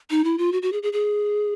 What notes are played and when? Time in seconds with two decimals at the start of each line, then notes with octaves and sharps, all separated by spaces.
0.10 D#4
0.24 E4
0.38 F4
0.52 F#4
0.62 F#4
0.72 G#4
0.83 G#4
0.93 G#4